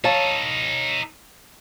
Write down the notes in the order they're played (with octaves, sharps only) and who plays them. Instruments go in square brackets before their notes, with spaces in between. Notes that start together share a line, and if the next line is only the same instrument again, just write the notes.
[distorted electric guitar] D#4 A4 [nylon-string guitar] C#5 F5 A5